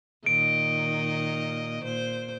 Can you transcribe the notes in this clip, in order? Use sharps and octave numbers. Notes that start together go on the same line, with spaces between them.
A#2 D#3 D#5 D7
A#2 C5